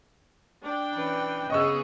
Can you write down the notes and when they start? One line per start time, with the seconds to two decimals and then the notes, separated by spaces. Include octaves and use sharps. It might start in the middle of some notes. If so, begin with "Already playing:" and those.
0.61 D4 G5
0.94 E3 C#4 B4
1.50 C#3 B3 C#4 G#4 D#5 C#6 E6